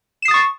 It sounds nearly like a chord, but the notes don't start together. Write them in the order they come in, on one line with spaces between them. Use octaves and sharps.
E7 C7 D#6 A6 C#6